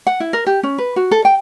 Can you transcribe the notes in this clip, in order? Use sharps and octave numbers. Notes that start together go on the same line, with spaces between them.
F#5
E4
A#4
G4
C#4
B4
F#4
A4
G5